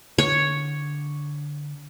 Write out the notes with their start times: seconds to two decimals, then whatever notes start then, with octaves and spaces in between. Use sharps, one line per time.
0.18 D3 C#5